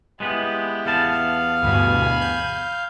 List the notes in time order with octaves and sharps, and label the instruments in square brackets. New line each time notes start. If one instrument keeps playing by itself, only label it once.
[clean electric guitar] G#3 B3 B4 [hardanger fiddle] E4 G4
[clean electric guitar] E2 B3 A5 [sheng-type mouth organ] F5
[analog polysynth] D2 G2 B2 [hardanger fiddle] G#5 B5
[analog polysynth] G6